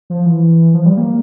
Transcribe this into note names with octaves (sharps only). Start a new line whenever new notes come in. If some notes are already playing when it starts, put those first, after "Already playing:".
F3
E3
F3
G3
A#3